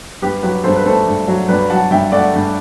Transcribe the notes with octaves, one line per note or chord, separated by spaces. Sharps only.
G2 G4 B4
F#3 G4 B4
G2 A4 C5
B4
A3 A4 C5
G2
F#3
G2 B4 D5
F#3 F#5 A5
G2 E5 G5
A3 D5 F#5
G2